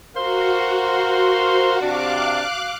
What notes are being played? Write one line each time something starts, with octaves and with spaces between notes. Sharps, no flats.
F#4 A#4 C5 F5
C3 D4 F5 D6 F#6